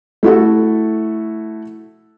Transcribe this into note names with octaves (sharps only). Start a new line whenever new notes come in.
A3 E4 F#4 A4